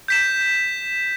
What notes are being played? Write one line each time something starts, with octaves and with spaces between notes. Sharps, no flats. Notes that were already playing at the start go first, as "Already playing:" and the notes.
G6 B6 E7